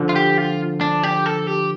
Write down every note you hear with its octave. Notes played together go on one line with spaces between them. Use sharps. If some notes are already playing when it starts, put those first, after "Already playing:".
Already playing: D3 F3
F4
G4
F4
D4
G4
A4
G4